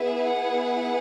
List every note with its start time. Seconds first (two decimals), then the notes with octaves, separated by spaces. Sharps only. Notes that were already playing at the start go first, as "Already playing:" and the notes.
Already playing: B3 E4 G#4 E5
0.29 F#5